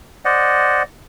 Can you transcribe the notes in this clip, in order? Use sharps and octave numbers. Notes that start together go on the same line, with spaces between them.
C5 D5 D#5 F#5